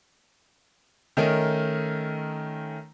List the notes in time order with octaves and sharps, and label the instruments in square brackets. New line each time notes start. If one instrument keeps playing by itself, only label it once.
[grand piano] D#3 A3 C#4 D#4 A#4